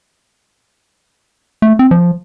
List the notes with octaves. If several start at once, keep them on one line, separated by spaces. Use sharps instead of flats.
A3
C4
F3